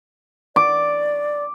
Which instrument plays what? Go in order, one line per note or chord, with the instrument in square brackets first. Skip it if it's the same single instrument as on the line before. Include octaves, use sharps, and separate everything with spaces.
[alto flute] D5 [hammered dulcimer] D6